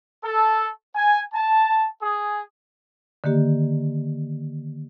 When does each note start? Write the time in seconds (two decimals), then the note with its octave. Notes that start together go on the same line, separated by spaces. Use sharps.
0.23 A4
0.94 G#5
1.34 A5
2.02 G#4
3.24 D3 D#3 A#3 G4